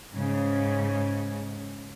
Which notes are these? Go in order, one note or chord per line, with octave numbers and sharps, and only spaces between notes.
G#2 C#3